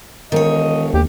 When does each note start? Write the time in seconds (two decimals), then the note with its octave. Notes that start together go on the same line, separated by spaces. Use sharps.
0.32 E1 D#3 C#5 D#5
0.94 D#2 G4